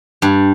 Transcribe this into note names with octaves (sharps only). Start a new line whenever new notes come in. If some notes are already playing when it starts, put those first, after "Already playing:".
G2